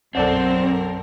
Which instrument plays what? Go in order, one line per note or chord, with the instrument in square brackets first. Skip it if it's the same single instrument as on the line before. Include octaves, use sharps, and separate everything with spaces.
[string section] B1 F#2 A#4 [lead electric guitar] C4 [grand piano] A4 D5 F#5